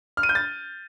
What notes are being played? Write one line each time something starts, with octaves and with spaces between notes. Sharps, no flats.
F6
D#7
G6
A6